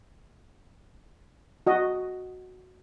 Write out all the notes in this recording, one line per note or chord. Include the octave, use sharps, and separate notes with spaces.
F#4 D#5